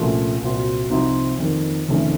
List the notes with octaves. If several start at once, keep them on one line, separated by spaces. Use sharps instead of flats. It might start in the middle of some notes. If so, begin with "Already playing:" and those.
Already playing: C2 A#2 F3 A3 C#4
C2 A#2 F#3 C4
C2 C3 F3 C4 D#4
F2 D#3 A#3
F1 F2 D#3 A3 C#4